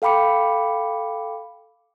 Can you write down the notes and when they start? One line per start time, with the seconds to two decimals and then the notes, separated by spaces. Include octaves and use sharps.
0.02 A4 F5 G5 B5 D6 C#7